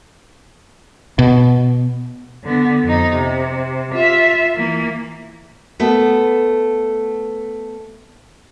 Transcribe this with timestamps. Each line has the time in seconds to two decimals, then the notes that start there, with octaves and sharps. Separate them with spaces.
1.19 B2
2.44 D3 B3
2.84 F2 D#4
3.13 C3
3.91 F4 E5
4.56 E3 A#3
5.80 A3 B3 B4